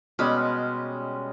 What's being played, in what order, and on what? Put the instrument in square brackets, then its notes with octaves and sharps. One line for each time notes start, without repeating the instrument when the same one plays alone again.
[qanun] B2 B5 [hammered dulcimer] G3 G#3 C#4